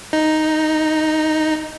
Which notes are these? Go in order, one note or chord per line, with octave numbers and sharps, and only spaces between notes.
D#4